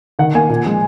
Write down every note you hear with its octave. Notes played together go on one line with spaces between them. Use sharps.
D#3 F#5
A#3 G#5
A#2
F3 G#3